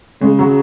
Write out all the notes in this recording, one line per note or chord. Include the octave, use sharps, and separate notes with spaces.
C#3 G#3
F#3